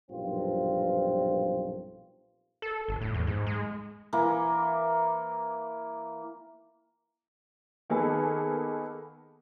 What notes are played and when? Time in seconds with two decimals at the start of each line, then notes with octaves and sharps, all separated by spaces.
0.11 B1 G2 A#2 F3 C4 F4
2.62 A4
2.88 G1
3.01 A2
3.14 E2
3.27 G#2
3.47 G#3
4.13 E3 A#3
7.90 D#3 A#3 B3 G#4 A4